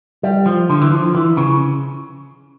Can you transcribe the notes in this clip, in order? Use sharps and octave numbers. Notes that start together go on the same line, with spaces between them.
G3
F3
D3
E3
F3
E3
C#3